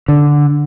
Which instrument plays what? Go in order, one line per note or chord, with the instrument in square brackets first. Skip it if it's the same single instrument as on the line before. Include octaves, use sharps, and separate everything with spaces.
[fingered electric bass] D3